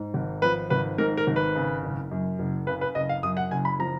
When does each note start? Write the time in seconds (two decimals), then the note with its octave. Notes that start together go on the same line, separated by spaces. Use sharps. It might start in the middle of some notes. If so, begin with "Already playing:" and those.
Already playing: G#2
0.14 G#1
0.42 F3 B4
0.70 G#1 B4
0.98 G#2 A#4
1.17 A#4
1.27 G#1
1.36 B4
1.55 C#3
1.83 F#1
2.11 F#2
2.39 F#1
2.67 C#3 B4
2.81 B4
2.95 F#1 D#5
3.09 F5
3.23 F#2 D#6
3.37 F#5
3.51 F#1 G#5
3.65 B5
3.79 F3 A#5